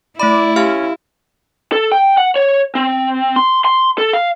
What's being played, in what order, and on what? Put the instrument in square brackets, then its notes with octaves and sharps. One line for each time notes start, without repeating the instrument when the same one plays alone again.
[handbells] A3 B5 [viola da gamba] E4 [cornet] D5
[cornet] C#4 [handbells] G4 F5 F6
[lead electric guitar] A4
G5
F#5
C#5
C4
C6
C6
A4
F5